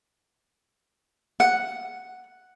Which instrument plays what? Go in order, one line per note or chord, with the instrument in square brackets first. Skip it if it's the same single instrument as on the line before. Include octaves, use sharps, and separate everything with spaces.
[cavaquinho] F#5